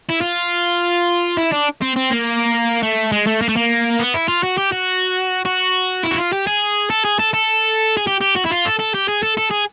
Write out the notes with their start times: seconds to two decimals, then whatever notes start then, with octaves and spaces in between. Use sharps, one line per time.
0.10 E4
0.21 F4
1.37 E4
1.52 D4
1.82 C4
1.96 C4
2.11 A#3
2.83 A3
3.12 G#3
3.27 A3
3.41 A#3
3.49 A3
3.56 A#3
3.99 B3
4.14 E4
4.28 F4
4.43 F#4
4.58 G4
4.72 F#4
5.46 F#4
6.04 E4
6.11 F#4
6.18 F4
6.33 G4
6.47 G#4
6.90 A4
7.05 G#4
7.19 A4
7.34 A4
7.97 G#4
8.07 G4
8.21 G4
8.35 F#4
8.45 E4
8.51 F4
8.65 A4
8.79 A4
8.94 G4
9.08 G#4
9.23 A4
9.38 A4
9.51 G#4